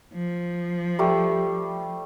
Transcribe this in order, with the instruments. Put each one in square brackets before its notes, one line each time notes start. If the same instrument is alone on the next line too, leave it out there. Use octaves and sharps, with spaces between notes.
[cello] F3
[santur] G3 A3